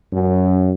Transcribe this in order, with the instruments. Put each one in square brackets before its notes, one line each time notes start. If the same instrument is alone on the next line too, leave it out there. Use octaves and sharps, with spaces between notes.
[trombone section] F#2